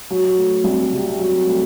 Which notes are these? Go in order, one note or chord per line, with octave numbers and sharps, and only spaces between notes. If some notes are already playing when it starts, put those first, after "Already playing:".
F#3
A3
C2
C3
F#3
A3